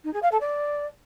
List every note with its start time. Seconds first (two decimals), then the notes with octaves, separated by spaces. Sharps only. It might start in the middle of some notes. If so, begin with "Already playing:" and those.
0.04 D#4
0.13 G#4
0.22 F5
0.31 A4
0.40 D5